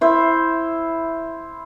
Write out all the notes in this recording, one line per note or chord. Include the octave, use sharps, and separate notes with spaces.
E4 C5 E5